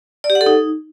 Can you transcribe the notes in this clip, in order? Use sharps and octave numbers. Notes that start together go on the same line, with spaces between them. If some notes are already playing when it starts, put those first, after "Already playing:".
D5
G4
F#5
A4
D#4